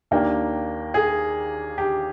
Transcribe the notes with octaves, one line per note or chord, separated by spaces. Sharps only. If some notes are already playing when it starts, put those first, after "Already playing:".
D#2 D#3 A#3 D4 G5
G#4
G4